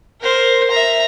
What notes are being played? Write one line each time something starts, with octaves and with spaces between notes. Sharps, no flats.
A#4 C5
E5 A#5